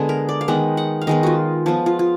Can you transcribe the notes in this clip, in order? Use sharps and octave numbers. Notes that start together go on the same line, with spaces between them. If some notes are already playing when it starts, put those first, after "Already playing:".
Already playing: D3 G#3 B3 G#4
A#4
D5
F5
D#3 G#3 B3 F#5
F#5
F5
D#3 G#3 B3 D#5
F4 F#4
F3 B3 F4
F4
F4